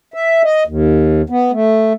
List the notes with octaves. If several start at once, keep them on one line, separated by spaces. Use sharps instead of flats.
E5
D#5
D#2
B3
A3